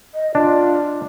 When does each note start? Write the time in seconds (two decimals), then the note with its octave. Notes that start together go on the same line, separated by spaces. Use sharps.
0.14 D#5
0.35 D4 F4